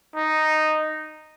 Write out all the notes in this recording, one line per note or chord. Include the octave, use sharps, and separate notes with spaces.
D#4